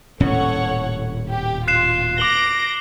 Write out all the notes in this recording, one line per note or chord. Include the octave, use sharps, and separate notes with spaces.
D#1 A2 C#4 A4 C#5 F#5
G4
F4 F#6 C7 E7
D6 A#6 D7 F#7 G7